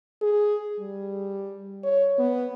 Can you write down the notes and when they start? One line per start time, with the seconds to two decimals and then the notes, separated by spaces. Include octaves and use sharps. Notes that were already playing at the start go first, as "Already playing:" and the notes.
0.22 G#4
0.79 G3
1.84 C#5
2.19 B3